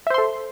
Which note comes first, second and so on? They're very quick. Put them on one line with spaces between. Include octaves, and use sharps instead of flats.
E5 C5 C6 A4